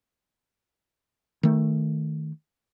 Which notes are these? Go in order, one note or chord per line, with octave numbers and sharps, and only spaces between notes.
D#3 A3